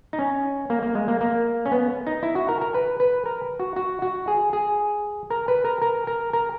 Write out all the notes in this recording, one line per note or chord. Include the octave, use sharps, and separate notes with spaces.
D#4
C#4
A#3
A#3
G#3
A#3
A#3
C#4
B3
D#4
E4
F#4
A#4
A#4
B4
B4
A#4
F#4
F#4
F#4
G#4
G#4
A#4
B4
A#4
A#4
A#4
A#4